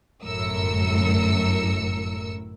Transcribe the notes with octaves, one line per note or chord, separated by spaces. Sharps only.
G1 F#2 A2 A#4 E6 C#7